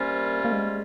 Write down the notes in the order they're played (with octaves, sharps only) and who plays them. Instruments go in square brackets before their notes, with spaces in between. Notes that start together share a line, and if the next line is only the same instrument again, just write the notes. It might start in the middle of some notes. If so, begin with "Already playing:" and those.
Already playing: [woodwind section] C3 G3 C#4 F4 [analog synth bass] A#3
[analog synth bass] A#3
G#3